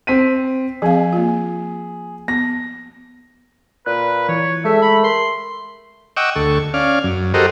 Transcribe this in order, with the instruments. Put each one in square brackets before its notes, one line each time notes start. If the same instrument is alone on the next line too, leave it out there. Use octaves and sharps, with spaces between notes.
[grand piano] C4 B6 D#7
[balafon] F3 C4 F5 [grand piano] G#4
[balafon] A#3 F4
[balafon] B3 [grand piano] A#6
[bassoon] A#2 [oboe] B4 [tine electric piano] F#6
[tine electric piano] E3 [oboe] C#5
[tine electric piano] G#3 G#4 [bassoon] A3 [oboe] E5
[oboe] B5
[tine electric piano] A#4 [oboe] C6
[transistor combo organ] D#5 F#5 G5 C#6 D6 E6
D2 A4 C#6
C#4 D5 F5
F#2
F#4 G4 A4 A#4 C5 D#5